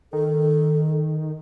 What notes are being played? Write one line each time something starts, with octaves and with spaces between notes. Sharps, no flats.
D#3 A4